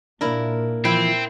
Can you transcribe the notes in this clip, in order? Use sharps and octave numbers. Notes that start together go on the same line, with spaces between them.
A#2 A#3 D4 E4 A#4
E3 F3 C4 E4 G5